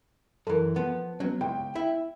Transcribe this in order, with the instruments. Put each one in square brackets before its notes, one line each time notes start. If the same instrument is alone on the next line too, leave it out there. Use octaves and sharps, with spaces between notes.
[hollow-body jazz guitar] F#2 E3 [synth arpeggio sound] A4 A#4
[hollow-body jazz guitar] F3 B3
[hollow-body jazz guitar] F#3 [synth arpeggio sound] B3 C#4
[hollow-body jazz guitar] C#2 [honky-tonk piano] G5
[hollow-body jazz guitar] E4 E5